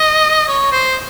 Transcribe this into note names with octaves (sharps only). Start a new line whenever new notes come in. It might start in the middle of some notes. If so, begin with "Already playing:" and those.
Already playing: D#5
C#5
C5